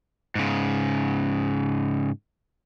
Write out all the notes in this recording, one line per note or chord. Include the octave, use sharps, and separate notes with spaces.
G#2 C#3